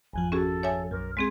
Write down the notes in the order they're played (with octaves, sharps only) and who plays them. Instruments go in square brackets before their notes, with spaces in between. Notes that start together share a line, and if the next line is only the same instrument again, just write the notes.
[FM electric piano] G#1 F2 F3 [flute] G#5
[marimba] C#4 F#4 G#4 [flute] A4
[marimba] C#5 E5 G#5
[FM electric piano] B1 F#2 [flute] A#4
[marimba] G#3 C4 G#4 [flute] C6